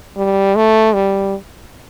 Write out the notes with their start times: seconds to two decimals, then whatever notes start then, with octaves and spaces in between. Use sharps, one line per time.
0.17 G3
0.56 A3
0.94 G3